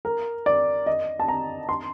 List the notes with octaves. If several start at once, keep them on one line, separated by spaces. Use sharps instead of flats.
A#4
D5
D#5
A5
A#5
C6